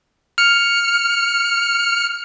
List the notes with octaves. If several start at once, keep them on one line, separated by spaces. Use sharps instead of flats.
F6 C#7